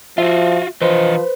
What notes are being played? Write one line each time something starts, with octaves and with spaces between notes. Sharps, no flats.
F3 F4 F#4 E5
E3 F3 B4 C5 D#5